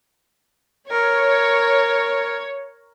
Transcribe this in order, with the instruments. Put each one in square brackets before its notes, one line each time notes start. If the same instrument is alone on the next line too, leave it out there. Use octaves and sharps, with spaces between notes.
[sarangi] A#4 [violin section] C#5